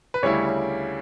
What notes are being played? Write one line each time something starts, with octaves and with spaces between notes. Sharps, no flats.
B4
D2 C#3 G3 C#4 E4 C#5